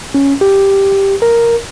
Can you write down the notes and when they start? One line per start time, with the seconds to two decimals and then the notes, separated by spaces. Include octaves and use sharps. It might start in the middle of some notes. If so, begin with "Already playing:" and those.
0.15 C#4
0.41 G4
1.22 A#4